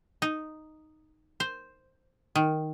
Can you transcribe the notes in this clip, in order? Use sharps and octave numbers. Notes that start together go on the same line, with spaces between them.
D#4
C5
D#3